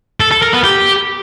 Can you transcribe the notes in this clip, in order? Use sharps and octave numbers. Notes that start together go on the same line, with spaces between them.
A4
A4
A#4
B3
G4